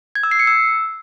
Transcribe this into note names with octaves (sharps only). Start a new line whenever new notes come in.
G#6
E6
C7
C#7
E6